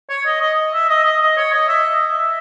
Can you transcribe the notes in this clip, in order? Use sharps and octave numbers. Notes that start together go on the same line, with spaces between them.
C#5
D#5
D#5
E5
D#5
D#5
D#5
C#5
D#5
E5
D#5
E5